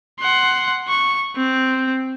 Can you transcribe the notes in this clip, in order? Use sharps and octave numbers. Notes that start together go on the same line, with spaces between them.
F#5 C6
C#6
C4